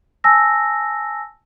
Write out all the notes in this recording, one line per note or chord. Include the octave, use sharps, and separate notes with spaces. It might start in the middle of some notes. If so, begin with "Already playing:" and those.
G#5 A5 E6 A#6